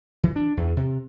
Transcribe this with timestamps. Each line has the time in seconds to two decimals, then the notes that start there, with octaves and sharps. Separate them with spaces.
0.23 E3
0.36 D4
0.57 E2
0.77 C3